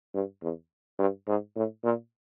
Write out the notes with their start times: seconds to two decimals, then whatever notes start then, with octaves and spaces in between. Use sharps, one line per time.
0.14 G2
0.42 E2
0.99 G2
1.28 G#2
1.56 A2
1.84 A#2